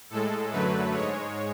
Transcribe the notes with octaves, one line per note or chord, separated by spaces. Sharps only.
A2 G#3 A4
F#2 D3 F#3 A3 B4
G#2 G#3 C#5